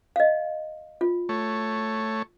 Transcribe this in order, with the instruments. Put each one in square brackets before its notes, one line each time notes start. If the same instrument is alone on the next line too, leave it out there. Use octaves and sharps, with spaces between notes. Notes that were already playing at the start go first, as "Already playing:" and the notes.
[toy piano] D#5 F5
F4
[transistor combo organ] A3 C#5